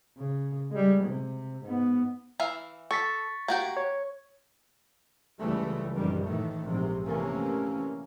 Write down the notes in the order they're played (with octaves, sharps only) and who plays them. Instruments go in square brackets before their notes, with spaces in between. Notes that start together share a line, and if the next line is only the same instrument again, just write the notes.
[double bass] C#3
G3 G#3
C3
G#2 B3
[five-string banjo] E3 E5 F5
[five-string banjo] A4 [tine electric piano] C#6 A6 B6
[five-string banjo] A#3 F#4 G4
[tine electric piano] C#5
[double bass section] C#2 E3 G3 A3
A#1 F#2 C3 D#3 E3 G3
A2 D#3 E3 A3
A#1 G#2 C3
C3 E3 A3 A#3 C#4